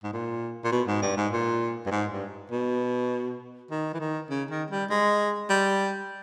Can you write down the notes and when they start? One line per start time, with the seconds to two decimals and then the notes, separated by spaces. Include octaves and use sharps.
0.04 G#2
0.13 A#2
0.64 A#2
0.72 B2
0.87 G#2
1.02 G2
1.17 G#2
1.32 A#2
1.86 G2
1.91 G#2
2.11 G2
2.51 B2
3.71 D#3
3.93 E3
4.00 D#3
4.30 C#3
4.50 D#3
4.70 G3
4.90 G#3
5.50 G3